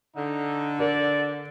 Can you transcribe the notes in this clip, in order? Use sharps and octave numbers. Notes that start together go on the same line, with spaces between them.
D3 D#4
A#4 D5